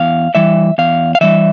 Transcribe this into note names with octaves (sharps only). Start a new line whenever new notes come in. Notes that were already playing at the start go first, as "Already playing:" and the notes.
Already playing: E2 F5
E3 G3 E5
E2 F5
F5
E3 G3 E5